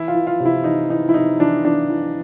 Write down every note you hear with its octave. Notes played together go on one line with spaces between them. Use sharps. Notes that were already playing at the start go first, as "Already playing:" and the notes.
Already playing: E3 E4
F4
E3
F4
C3
E4
E3 D#4
E3 D#4
E4
C3 D#4
E3 D4
E3 D4
E3